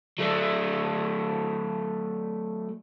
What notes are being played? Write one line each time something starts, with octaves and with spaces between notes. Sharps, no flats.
F#3 A3